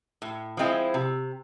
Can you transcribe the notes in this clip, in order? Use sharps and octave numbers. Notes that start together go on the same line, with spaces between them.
A2
F3 G#3 C4 E4
C3